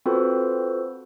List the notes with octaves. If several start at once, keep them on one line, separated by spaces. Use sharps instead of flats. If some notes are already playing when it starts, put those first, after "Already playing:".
C4 F4 F#4 A4 B4 C5